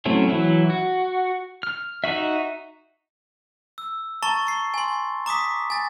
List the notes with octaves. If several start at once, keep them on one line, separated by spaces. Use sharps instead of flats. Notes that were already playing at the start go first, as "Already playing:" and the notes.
F#3 A3 C4 C#4 E4
E3 F#3 E4
F#4
F6
D#4 F#4 E5
E6
A5 A#5 C#6 A6 G7
C#6 C7
G#5 C6
A#5 D6 D#6 B6
G#5 A6